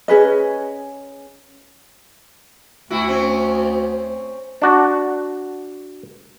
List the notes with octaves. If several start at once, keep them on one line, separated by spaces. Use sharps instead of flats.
C#4 G#4 B4 D#5
D2 E4 F#4
C4 C#4
D4 F#4